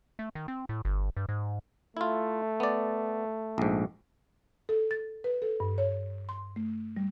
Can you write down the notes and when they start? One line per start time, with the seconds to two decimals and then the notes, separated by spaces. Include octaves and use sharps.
0.19 A3
0.35 D#3
0.48 C4
0.69 A2
0.85 G1
1.17 G2
1.29 G#2
1.97 A3 E4 F4
2.60 B3 D5
3.58 A#1 G#2
4.69 A4
4.91 A6
5.24 B4
5.42 A4
5.60 G2
5.78 C#5
6.29 C6
6.56 A3
6.97 G3